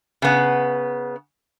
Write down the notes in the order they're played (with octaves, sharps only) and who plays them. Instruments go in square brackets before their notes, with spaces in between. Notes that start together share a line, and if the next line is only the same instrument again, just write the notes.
[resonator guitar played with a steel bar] C#3 B3